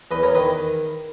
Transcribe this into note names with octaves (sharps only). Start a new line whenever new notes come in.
E2 B4 D#5
A#4 C#5
D#3 B4 D#5